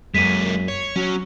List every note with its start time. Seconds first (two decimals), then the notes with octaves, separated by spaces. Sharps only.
0.15 F#2 G#3 A#3 B6 D#7
0.68 C#5
0.96 F#3 C#4